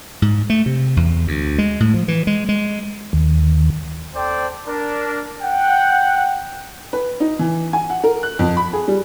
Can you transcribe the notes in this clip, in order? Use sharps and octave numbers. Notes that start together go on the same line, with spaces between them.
G#2
A3
C3
E2
D2
G#3
A2
F3
E3
G#3
G#3
D#2
C4 A4 C5 D5 G5
D4 A#4
F#5 G5
B4
D#4
E3
G#5
F#5
A#4
F#6
F2
B5
G#4
G3